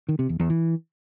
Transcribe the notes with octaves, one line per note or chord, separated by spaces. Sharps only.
D#3
C3
E2
E2
E3